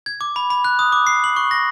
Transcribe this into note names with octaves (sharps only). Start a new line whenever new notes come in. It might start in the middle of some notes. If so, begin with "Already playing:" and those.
G#6
D6
B5
B5
F#6
D#6
D6
C7
F#7
C#6
A#6